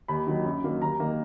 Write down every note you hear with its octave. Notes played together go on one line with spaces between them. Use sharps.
D#2 B5
D#3 F#3
F#2
D#3 F#3 A#3
D#2 A#5
D#3 A#3